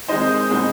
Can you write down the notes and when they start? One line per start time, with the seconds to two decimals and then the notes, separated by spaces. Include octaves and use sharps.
0.08 D#3 G#3 C4 D#4 C5 D#5
0.50 B2 G#3 C4 D#4